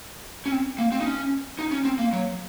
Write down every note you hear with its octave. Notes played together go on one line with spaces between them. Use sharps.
C#4
C4
A#3
C4
D#4
C#4
D#4
C#4
C4
A#3
F#3